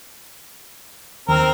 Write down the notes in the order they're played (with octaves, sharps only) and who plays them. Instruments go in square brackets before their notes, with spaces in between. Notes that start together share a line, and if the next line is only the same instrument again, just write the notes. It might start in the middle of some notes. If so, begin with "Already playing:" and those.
[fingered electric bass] D#2 [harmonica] C4 A#4